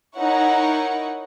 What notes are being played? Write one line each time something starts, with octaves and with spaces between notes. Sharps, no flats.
D#4 E4 A#4 C#5 F#5 C#6